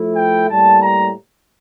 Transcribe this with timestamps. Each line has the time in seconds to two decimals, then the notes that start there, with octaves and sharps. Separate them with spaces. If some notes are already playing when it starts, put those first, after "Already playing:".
Already playing: F3 A3 E4
0.16 G5
0.48 A2 G3 A#3 A5
0.81 A#5